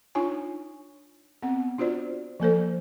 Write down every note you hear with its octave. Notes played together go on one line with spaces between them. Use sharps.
D4 D#4 F4 C#5 G#5
B3 C4 F#5
D4 F4 F#4 C5 D5
F3 A#3 A4 C5